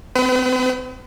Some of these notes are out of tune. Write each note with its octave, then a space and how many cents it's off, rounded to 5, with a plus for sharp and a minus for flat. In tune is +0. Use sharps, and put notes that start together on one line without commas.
C4 -40 B4 +40